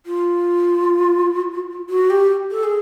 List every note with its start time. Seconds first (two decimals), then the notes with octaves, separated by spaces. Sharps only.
0.06 F4
1.90 F#4
2.10 G4
2.51 A4
2.64 G#4